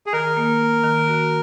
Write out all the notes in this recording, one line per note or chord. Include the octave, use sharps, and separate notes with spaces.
G#4
D#3 A#4
A#3
A#3
D#3
F#4